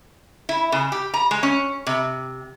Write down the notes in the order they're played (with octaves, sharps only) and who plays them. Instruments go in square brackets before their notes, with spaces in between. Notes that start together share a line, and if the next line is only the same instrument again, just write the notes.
[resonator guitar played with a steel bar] E4
C#3
G4
A#5
G#3
C#4
C3